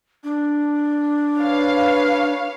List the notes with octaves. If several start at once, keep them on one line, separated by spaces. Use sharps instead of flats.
D4
B4 C#5 F5